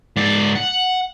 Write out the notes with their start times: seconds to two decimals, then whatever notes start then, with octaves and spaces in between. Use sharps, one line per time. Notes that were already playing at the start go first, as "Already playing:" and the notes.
0.17 G#2 D5
0.55 F#5